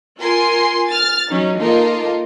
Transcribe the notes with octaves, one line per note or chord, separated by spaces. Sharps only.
F4 A#4 G#5 C6
F6 A6
F#3 C#4 D#4
A#3 D#4 F4 A4 A#4 D#5